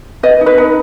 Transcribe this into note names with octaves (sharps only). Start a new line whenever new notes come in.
B4 D#5
D#4
B4
D#4